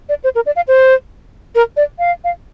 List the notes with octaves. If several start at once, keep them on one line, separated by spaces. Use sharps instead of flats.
D5
C5
A#4
D5
F5
C5
A#4
D5
F5
F5